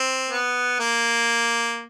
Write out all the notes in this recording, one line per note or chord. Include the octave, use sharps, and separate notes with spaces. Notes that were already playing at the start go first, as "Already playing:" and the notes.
Already playing: C4
B3
A#3